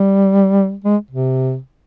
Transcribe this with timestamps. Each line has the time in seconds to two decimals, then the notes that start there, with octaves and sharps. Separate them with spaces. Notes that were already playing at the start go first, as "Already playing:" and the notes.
Already playing: G3
0.84 G#3
1.11 C3